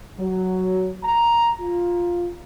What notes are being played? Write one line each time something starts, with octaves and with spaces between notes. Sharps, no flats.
F#3
A#5
F4